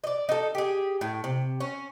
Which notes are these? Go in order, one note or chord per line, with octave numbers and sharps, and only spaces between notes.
D5 D#5
D#4 A4
G4 G#4
A2
C3
C#4